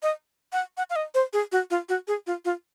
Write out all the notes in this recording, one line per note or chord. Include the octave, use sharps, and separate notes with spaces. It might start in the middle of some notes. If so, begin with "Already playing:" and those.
D#5
F#5
F#5
F5
D#5
C5
G#4
F#4
F4
F#4
G#4
F4
F4